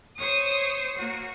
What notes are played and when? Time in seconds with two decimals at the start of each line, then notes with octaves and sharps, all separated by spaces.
0.18 C5 C#5 D#6
0.97 A#3 F#4